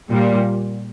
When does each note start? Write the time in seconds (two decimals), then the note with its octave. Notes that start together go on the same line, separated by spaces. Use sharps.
0.10 A#2 G3